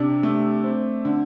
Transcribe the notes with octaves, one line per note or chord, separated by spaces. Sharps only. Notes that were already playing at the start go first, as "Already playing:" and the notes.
Already playing: C3 D4
A3
C4
D3